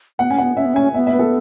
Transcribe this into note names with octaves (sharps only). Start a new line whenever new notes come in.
B3 F#5
C#4 G#5
B3 F#5
C#4 E5
B3
C#4 G#5
B3 E5
E5
B4
A4